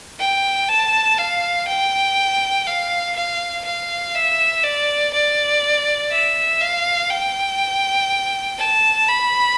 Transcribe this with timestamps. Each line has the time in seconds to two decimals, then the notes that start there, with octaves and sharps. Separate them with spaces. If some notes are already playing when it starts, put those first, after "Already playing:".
0.19 G5
0.69 A5
1.18 F5
1.67 G5
2.67 F5
3.15 F5
3.65 F5
4.15 E5
4.64 D5
5.13 D5
6.11 E5
6.61 F5
7.10 G5
8.58 A5
9.08 B5